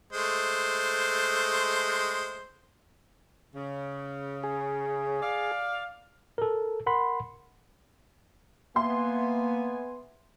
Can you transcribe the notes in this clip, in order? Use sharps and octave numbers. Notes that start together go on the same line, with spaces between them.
G#3 A3 C5
C#3
G#4
D5 F5
A4 A#4
A#4 F#5 B5 C6
A#3 B3 E5 G#5 C6